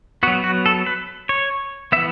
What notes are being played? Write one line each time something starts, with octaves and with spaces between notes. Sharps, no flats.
F#3 B3 F#4
F#4
A4
B4
C#5
E3 B3 E5